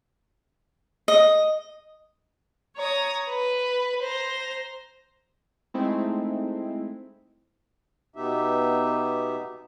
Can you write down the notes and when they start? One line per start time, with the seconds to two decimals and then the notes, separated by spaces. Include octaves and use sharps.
1.08 D#5
2.75 C#5 A#5 D#6
3.30 B4
4.02 C5 A#5
5.74 G#3 A3 C4 D#4 E4
8.16 B2 B3 D#4 G4 E5